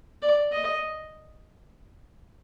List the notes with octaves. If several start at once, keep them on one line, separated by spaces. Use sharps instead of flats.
D5
D#5